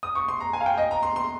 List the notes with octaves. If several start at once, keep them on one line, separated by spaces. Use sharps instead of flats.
D#6
C#6
C6
A#5
G#5
F5
G5
D#5
A#5
C6
C6